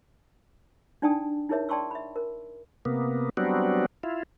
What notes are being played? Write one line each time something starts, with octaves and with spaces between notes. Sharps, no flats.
D4 D#4 D5 G5 A5 D#6
D#4 E4 G#4 A#4 C#5 E5
D5 G5 A5 C6 C#6 E6
E5 B5
A#4
C3 A#3 B3
F#3 G3 B3 C4 D4 F#4
E4 F4